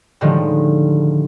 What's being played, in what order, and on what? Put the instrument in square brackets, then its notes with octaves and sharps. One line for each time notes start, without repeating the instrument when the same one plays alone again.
[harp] A2 D3 D#3 F3 G3 G#3